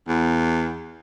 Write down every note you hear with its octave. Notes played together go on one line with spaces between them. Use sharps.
E2